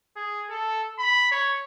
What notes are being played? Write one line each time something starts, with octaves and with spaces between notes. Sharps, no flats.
G#4
A4
B5
C#5